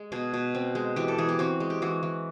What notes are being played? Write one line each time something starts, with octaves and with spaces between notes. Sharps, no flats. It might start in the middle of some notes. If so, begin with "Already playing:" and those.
Already playing: G#3
B2 G#4
B2
C4
G#3
E3 G4
A4
E3 G#4
G4
C4 F#4
G#3
G4
E3 F#4
E3